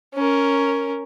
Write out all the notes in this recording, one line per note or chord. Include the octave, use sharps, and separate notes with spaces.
C#4 A#4